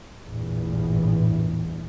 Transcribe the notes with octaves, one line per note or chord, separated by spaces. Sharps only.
A1 E2 G2 A#2